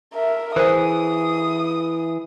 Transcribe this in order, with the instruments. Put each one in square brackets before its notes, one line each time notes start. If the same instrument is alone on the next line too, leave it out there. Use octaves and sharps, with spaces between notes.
[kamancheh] A#4 E5
[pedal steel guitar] E3 G#4 [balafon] A#4 C5 [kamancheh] D#6